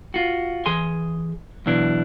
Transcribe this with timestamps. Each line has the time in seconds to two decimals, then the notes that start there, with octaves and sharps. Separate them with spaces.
0.14 F4 F#4
0.66 E3 G#4 G#5 C6
1.66 B1 B2 E3 D4